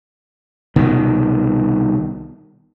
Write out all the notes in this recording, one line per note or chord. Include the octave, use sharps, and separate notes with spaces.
C2 B2 D#3